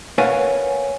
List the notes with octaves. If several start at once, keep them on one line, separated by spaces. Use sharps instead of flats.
A#4 B4 C#5 F5 F#5 G#5